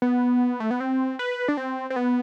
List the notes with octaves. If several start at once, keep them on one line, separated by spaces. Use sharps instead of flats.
B3
A3
B3
C4
B4
D4
C4
C4
B3